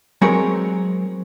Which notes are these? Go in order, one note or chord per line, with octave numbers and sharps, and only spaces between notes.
F#3 G#3 C4 G#4 A#4 C#5